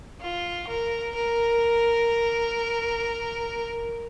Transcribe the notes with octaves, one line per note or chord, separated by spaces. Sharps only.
F4
A#4
A#4